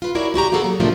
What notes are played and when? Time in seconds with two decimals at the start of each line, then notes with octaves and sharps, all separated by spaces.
0.02 F4 B4
0.15 E4 F#4 A#4 C#5 D5
0.34 G#3 F#4 G4 A#5
0.52 A#3 B3 F#4 G#4 A4
0.64 F#3
0.80 A2 C3 F3 A3 A#3 D4